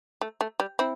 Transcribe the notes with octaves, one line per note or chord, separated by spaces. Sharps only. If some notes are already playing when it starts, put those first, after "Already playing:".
A3
A3
G3
C4 E4